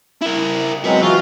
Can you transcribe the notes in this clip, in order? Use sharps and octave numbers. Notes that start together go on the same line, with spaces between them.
E4 A#4
F#3 G#3 C4 F#4 B4
E3 F4 F#4